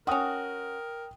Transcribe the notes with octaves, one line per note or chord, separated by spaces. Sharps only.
C#4 F#4 A#4 G5 D#6